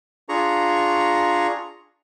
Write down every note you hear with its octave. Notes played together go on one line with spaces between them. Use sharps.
D4 F4 G#4 A#5 C#6